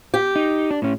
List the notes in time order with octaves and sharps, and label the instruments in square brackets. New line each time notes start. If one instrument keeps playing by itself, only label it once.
[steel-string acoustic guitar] G4
[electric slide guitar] D#4
D4
A2 C#4